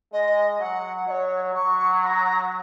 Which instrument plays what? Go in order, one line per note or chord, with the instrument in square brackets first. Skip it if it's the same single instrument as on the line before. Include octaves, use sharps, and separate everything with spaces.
[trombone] G#3 [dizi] D#5
[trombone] F#3 [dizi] F#5
[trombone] F#3 [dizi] D#5
[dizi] C#5
[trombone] F#3 [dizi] C#6
[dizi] C#6
A#5